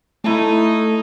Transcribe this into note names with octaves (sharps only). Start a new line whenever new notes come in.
A3 D#4 E4 D#5 A5